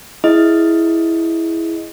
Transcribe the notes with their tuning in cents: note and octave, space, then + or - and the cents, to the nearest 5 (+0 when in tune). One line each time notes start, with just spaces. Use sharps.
E4 +0 G#4 +10 D#5 +0